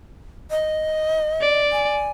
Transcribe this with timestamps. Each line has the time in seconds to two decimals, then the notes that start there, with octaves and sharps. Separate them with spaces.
0.51 D#5
1.41 D5
1.72 G#5